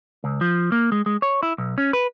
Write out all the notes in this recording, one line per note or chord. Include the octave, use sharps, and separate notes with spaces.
C#2
F3
A#3
G#3
G#3
C#5
E4
B1
C#4
B4